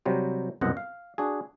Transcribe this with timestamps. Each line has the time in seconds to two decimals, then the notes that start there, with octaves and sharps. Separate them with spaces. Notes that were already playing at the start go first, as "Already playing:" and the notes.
0.05 C3 F#3 G3 C5
0.61 C2 F#2 B2 C5 D#5 F#5
0.77 F5
1.18 D4 F#4 G#4